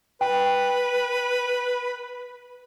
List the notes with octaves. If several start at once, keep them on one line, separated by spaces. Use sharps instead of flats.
B4 G5